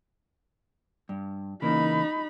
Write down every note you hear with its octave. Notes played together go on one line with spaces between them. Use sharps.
G2
C#3 E3 A#3 D#4 B5